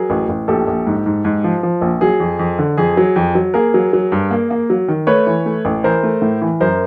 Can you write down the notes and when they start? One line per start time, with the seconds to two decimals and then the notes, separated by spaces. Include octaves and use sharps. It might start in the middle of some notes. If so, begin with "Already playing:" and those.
Already playing: F#3 G#4 A#4
0.10 A1
0.29 A1
0.48 A#1 G4 A4
0.67 A#1
0.87 G#2
1.06 G#2
1.25 G#2
1.44 F3
1.63 F3
1.81 A#1
2.01 F#3 G#4
2.20 F2
2.39 F2
2.59 D3
2.77 F2 G#4
2.97 F#3
3.16 F2
3.35 F#3
3.54 A#3 G#4 A#4
3.74 F#3
3.93 F#3
4.12 G2
4.31 A#3
4.51 A#3
4.70 F#3
4.88 D#3
5.07 A3 B4 C#5
5.27 E3
5.46 A3
5.65 A1
5.84 E3 A#4 C5
6.03 A3
6.22 A2
6.42 E3
6.60 F#2 A#4 C5